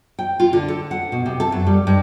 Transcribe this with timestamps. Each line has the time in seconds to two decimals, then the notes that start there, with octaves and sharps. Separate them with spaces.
0.19 G5
0.40 F4
0.53 D3
0.68 A4
0.91 F#5
1.12 B2
1.26 C3
1.40 A4
1.52 F#2
1.67 G3
1.87 G2